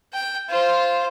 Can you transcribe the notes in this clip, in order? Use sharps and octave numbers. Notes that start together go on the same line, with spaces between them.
G5
F4 C5